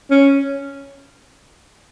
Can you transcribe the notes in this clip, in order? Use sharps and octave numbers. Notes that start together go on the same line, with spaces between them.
C#4